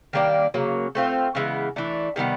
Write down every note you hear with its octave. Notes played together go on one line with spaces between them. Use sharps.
D#3 G3 A#3 D4
C#3 F#3 A#3
A3 C4 F4
C#3 E3 G#3 B3
E3 A3 D4
C3 D#3 G3 B3